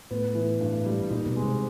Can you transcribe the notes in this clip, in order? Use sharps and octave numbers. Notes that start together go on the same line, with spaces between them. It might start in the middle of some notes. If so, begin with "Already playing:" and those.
A2 B3
E3
G2
G3
A#2 D#4
B2
G#3
C3